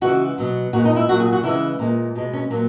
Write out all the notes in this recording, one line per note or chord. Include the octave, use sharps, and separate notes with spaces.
C#3 E3 G#3 F#4
B2 F#3
A#2 G#3 F#4
D#4
E4
A#2 F#3 F#4
G#4
F#4
C#3 E3 G#3 E4
A#2 G#3
B2 G#3
C#4
A#2 F#3 A#3